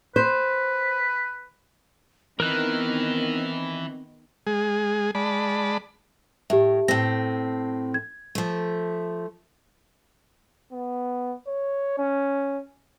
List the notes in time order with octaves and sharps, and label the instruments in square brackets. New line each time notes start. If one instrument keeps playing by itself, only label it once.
[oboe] B4 [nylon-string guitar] C5
[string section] D#3 B3 [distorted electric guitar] E3 [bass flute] C4 [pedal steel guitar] A#4 F#6
[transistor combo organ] G#3 G#4
G#3 D5 A5 B5
[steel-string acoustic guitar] A2 [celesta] G4 E5
[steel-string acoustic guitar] A2 C4 [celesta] A#6
[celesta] G#6
[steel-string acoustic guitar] F3 A3
[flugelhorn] B3
C#5
C#4